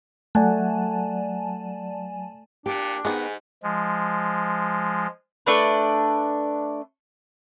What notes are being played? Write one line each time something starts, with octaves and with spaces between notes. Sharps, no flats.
F#3 A3 D5 F#5 G#5 A5 F#6
A#2 D4 G4
G#2 D#3 B3 G#4
F3 G#3
A3 D4 B4